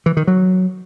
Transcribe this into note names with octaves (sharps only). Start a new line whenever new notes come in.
E3
D#3
F#3